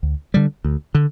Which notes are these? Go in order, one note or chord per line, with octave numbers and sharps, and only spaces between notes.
D2
D3 G3
D2
D3